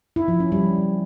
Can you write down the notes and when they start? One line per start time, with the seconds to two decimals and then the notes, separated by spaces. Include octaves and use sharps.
0.16 E4
0.28 F3
0.40 C#4
0.52 G3